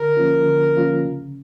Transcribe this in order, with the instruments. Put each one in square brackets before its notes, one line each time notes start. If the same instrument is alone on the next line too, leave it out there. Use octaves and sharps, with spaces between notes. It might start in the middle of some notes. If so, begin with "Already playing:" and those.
Already playing: [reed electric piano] D3 [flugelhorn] A#4
[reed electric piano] F3 A#3 C#4 F4
D3
F3 A#3 C#4 F4
C#3